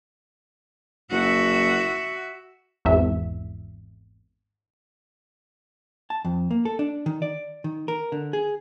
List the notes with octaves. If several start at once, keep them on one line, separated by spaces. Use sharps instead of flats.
F#1 F#4 E5
G#1 E2 E5
A5
F2
A#3
A4
D4
D#3
D5
D#3
A#4
D3
G#4